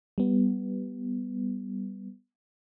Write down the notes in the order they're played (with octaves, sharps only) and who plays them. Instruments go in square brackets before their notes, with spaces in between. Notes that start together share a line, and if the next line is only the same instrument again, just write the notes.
[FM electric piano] G3 B3